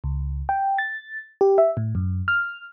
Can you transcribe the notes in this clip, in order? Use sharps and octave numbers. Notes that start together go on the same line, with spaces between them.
C#2
G5
A6
G4
E5
A2
F#2
F6